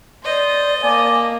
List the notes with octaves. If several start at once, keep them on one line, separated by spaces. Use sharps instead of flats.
C5 D5 D#5
A#3 G#5 A5 D6